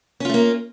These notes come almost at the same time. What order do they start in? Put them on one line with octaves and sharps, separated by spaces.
C#4 F4 A3 A#3